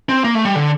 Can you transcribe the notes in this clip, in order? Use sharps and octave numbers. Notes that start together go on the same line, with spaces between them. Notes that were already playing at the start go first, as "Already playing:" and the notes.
C4
A#3
A3
G3
D3